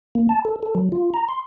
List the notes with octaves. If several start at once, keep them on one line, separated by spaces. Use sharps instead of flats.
A#3
A5
A4
A4
F#3
F4
A#5
C6